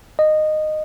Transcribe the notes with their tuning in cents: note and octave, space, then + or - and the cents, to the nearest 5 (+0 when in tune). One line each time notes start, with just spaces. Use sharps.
D#5 -15